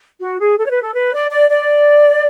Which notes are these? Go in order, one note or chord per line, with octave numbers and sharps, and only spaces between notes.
F#4
G#4
A4
C#5
B4
A4
B4
D5
D5
D5